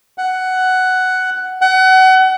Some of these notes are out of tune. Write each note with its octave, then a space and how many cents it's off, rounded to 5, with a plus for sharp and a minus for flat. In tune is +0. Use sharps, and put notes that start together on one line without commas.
F#5 +10
F#5 +30